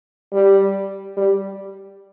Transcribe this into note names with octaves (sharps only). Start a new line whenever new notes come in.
G3
G3